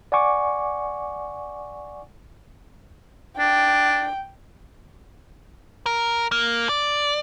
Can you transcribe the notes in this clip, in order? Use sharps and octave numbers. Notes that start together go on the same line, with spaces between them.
D5 F#5 G#5 C#6 D6
D4 G5
A#4
A#3
D5